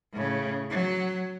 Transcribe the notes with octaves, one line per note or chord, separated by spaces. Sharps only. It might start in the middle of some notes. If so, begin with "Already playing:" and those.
A2 C#3
F#3